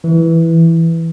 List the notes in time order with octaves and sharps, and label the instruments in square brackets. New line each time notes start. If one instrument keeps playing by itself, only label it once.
[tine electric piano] E3